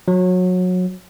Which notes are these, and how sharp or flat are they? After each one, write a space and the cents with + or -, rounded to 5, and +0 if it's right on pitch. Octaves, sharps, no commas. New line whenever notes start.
F#3 -25